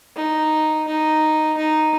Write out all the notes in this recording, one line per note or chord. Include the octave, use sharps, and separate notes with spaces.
D#4
D#4
D#4